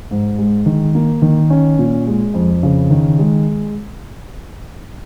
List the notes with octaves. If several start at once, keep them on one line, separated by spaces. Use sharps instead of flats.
G#2
G#3
D#3
A#3
D#3
C#4
A#2
G#3
F2
C#3
D#3
G#3